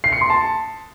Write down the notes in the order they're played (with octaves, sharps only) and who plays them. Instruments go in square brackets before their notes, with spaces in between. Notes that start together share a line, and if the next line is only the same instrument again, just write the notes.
[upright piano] C7
C#7
C6
A5